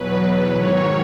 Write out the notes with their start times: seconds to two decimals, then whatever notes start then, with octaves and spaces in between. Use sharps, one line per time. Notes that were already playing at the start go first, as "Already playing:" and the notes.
Already playing: E2 B2 F#3 B4
0.24 B4
0.55 G#2 D#3 F#3 C#5